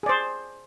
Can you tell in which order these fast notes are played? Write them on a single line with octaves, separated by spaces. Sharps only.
G#4 D5 C5